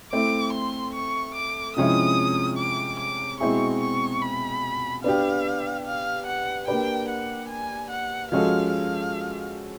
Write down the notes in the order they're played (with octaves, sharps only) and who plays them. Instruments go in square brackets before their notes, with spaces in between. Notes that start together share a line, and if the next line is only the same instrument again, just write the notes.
[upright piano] A3 C4 E4 [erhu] D6
[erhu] C6
C#6
D6
[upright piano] C3 F3 G#3 C#4 E4 [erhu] D#6
[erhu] D6
D6
[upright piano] B2 G#3 C4 E4 G#4 [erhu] C#6
[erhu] C#6
B5
[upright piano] B3 D4 G4 [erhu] F5
[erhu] F5
F#5
[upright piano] A#3 D4 G4 B4 D5 [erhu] G5
[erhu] F#5
G#5
F#5
[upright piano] F3 G#3 C#4 F#4 A4 [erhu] F5
[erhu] F5